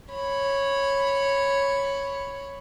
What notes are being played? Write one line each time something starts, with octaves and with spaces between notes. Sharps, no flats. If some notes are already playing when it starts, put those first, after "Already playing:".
C#5 B5